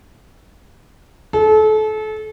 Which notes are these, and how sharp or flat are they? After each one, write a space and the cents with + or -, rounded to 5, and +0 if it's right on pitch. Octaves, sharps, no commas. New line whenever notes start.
A4 -30